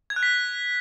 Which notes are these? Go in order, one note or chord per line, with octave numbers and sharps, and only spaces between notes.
G#6
F#6
B6